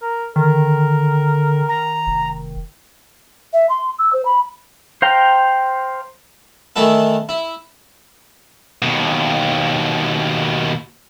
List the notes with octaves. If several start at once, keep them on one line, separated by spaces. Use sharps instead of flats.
A#4
D3 D#3 A#4
A#5
F1
E5
C6
E6
C5
B5
C5 F5 G5 A#5
D#3 E3 A3 E4 A4
E4
D#2 B2